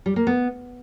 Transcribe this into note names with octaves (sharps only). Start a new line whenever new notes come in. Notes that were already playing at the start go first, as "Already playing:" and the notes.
G3
A#3
B3